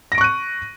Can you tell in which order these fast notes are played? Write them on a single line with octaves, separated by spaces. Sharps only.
A#6 D7 C#6 F#6 D#7